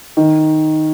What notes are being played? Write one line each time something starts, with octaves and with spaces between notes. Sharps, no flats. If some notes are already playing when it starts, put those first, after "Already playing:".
D#3